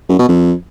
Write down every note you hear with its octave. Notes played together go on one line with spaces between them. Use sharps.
F#2
B2
F2